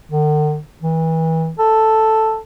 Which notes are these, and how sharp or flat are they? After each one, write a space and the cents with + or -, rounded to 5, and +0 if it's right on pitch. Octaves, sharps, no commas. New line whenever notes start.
D3 +45
E3 -30
A4 +0